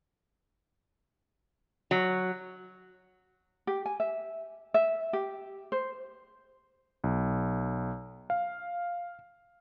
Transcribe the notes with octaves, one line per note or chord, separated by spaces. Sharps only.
F#3
G4
G#5
E5
E5
G4
C5
B1
F5